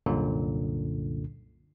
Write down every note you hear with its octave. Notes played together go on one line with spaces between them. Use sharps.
C2 F#2 A#2 D3